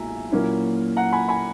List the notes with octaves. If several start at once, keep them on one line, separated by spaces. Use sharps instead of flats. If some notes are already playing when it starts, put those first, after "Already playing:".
Already playing: B1 A#2 G#3 E4 E5 G#5 A#5
A#2 F#3 A#3 C#4 E4
F#5 A#5
G#5 B5
G#5 B5